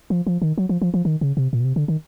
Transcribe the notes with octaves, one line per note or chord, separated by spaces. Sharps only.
F3
F3
D#3
F#3
F3
F3
F3
D#3
C#3
C3
A#2
B2
C3
D3
D#3